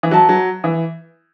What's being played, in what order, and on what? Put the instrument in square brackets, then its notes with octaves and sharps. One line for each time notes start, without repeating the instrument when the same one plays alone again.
[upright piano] E3
[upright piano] F#3 [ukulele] B4 E5 A5
[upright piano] F#3
E3